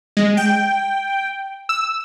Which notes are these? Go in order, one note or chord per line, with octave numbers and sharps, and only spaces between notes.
G#3
G5
E6